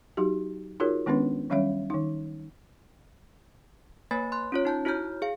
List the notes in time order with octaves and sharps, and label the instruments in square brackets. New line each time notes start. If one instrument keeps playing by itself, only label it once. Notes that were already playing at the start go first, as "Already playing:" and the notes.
[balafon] F#3 D#4 F#4 G4
D#4 F4 F#4 G#4 A#4 C#5
D#3 G#3 B3 C#4 D4 B4
D#3 F#3 G3 C#4 C#5 E5
D#3 D#4
[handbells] A#3 B4 C#5 G#5 B5 A6
C6 F#6
C#4 F4 C#5
D#4 A5 G6
E4 F#4 C#5 A#5 F6 G6
G#4 F5